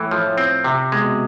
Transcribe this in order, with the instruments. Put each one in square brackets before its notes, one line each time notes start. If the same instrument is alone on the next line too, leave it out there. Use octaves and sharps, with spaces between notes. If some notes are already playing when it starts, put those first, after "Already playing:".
Already playing: [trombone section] A2 [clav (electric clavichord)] E3
[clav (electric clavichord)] F3
C4
C3
[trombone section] B2 [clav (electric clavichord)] G#3